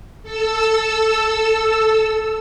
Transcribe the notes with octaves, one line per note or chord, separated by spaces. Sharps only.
A4 E6